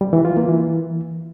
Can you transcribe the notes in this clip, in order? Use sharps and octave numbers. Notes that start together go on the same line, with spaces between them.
G3
E3
F4
A#3
E3